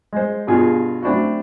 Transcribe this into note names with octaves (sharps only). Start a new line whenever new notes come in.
G#3 C5
G2 B2 F4 G#4
A3 C4 D4 E4 F#4